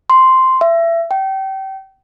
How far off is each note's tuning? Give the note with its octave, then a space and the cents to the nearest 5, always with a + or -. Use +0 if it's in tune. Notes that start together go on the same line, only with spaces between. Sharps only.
C6 -5
E5 +25
G5 -30